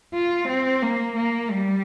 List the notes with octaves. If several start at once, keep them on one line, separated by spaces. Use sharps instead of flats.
F4
C4
A#3
A#3
G3